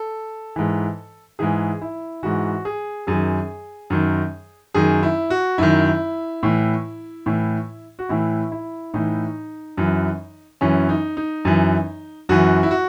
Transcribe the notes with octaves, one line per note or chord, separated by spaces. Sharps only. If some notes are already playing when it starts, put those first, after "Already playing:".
Already playing: A4
G#2 E3
G#2 E3 G#4
E4
G#2 E3 F#4
G#4
F#2 D#3 G#4
F#2 D#3
F#2 D#3 G#4
E4
F#4
F#2 D#3 E4
A2 E3
A2 E3
F#4
A2 E3 E4
E4
A2 E3 D#4
F#2 E3
F#2 E3 C#4
D#4
D#4
F#2 E3
F#2 E3 F#4
E4
F#4